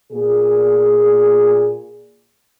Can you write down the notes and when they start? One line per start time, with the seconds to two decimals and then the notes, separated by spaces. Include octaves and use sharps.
0.12 A#2 G#4